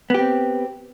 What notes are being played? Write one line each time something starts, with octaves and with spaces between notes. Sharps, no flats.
B3 C4 G4